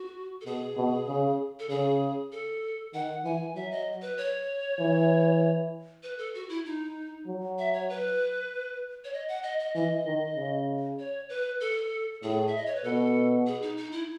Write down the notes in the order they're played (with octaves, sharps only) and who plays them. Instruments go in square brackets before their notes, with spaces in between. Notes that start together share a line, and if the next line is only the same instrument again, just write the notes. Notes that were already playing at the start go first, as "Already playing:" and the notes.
Already playing: [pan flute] F#4
A4
[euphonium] B2 [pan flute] G#4
[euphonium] B2
C#3
[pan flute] A4
[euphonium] C#3 [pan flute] G#4
[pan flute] A4
[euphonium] D#3 [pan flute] F#5
[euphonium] E3 [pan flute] G#5
[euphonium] F#3 [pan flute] E5
[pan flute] D#5
B4
C#5
[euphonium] E3
[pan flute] B4
A4
F#4
E4
D#4
[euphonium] F#3
[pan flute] E5
C#5
B4
C#5
D#5
F#5
D#5
D#5
[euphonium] E3 [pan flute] D#5
[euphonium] D#3
C#3
[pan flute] C#5
B4
A4
[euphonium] A2 [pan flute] G#4
[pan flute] E5
D#5
C#5
B4
[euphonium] B2 [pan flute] A4
[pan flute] G#4
D#4
D#4
E4